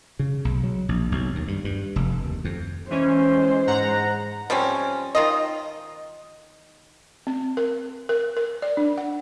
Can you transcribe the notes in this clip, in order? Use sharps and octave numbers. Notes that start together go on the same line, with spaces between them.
C#3
B1
F#3
A#1
B1
D#2
G2
G2
F1
D#2
F2
E3 G#3 C#4 C5
G#2 F#5 A#5
F3 G3 C4 C#4
D#3 F4 D#5
C4
A#4
A#4
A#4
D5
D4
F#5